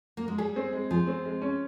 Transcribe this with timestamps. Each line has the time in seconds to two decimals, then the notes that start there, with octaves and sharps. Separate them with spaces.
0.17 A#3
0.28 G#3
0.38 G3 G#4
0.56 C4
0.73 G#3
0.91 F3 G#4
1.07 C4
1.25 G#3
1.41 C#4